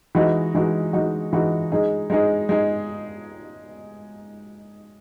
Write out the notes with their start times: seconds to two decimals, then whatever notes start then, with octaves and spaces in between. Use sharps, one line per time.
0.15 E3 G#3 D#4 F#4
0.55 E3 G#3 D#4 F#4
0.93 E3 G#3 D#4 F#4
1.33 E3 G#3 D#4 F#4
1.72 G#3 D#4 G#4
2.10 G#3 D#4 G#4
2.49 G#3 D#4 G#4